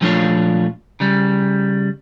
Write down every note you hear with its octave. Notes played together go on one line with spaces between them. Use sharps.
A#2 F3 A3 D4 F4 C#5
C#3 G3